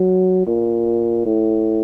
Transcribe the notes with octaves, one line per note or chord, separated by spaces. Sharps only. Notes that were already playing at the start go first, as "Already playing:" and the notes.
Already playing: F#3
A#2
A2